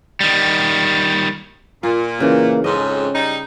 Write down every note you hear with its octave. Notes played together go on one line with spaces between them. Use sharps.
D#3 G3
A#2 F4
C#3 E3 A#3
F2 G#2 C#4 D#5
G3 D#4